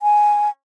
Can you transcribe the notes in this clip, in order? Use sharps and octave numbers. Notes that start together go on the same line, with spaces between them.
G#5